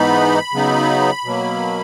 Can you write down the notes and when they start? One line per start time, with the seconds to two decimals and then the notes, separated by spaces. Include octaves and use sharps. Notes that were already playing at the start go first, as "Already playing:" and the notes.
Already playing: G#2 E3 B3 D#4 B5
0.53 C#3 F#3 B3 D#4
1.25 B2 F#3 A#3